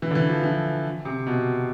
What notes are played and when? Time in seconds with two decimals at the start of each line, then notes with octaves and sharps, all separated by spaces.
0.02 E3
0.11 D3
0.15 E3
0.29 F3
0.44 E3
1.05 C3
1.27 B2